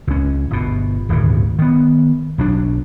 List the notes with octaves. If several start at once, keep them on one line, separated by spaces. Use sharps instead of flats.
C#2 C#4
G1 B2
D#1 G#1 D2 C#3
D#3 B3
B1 F#3 D4